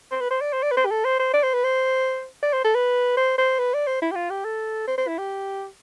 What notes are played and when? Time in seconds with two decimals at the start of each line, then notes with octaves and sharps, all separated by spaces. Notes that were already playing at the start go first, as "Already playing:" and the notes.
0.11 C5
0.21 B4
0.31 C5
0.41 D5
0.53 C5
0.63 D5
0.71 B4
0.77 C5
0.86 G4
0.91 A4
1.05 C5
1.19 C5
1.34 D5
1.43 C5
1.54 B4
1.64 C5
2.43 D5
2.53 C5
2.64 A4
2.75 B4
3.17 C5
3.38 C5
3.59 B4
3.74 D5
3.87 C5
4.02 E4
4.11 G4
4.15 F4
4.30 G4
4.45 A4
4.87 C5
4.98 C5
5.08 E4
5.18 G4